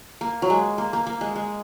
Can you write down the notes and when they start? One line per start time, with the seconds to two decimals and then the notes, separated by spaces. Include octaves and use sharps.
0.21 A#3
0.42 F#3
0.50 G#3
0.78 A#3
0.93 A#3
1.07 A#3
1.21 G#3
1.36 G#3